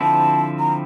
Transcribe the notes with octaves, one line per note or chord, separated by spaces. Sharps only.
D3 F3 C4 E4 A5
A#5